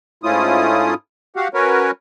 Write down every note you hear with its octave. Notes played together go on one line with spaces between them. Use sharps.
G#2 A3 C#4 E4 F4 D#6
F#4 G4 F5 F#5
C#4 F#4 A#4 B4 C#5